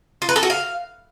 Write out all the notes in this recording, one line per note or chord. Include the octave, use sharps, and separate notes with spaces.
F4
B4
A4
F#4
F5